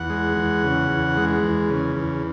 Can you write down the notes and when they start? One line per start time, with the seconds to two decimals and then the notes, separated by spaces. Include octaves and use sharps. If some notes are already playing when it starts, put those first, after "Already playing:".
Already playing: E2 F#5
0.10 G#3
0.37 E2
0.64 C#3
0.90 E2
1.17 G#3
1.43 E2
1.70 C#3
1.96 E2